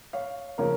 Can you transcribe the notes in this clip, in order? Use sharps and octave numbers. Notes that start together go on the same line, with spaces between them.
C#5 F5
C#3 F3 A#3 C#4 A#4 C#5